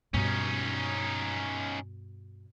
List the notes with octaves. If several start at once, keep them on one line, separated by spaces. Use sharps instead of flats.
G2 B2 C#4 D#4